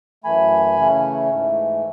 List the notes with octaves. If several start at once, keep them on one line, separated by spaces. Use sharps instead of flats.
F#2 E3 A3 G#5 B5
C#3 E3 A3 C#4
G#2 E3 A3